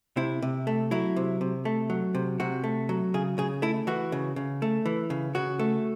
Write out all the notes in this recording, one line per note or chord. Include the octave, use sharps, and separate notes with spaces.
C3 E4
C3
A3
F#3 E4
C3
C3
A3
F#3
C3
C3 F#4
A3
F#3
C#3 G#4
C#3 G#4
A3 E4
E3 F#4
C#3
C#3
A3
E3
C#3
C#3 F#4
A3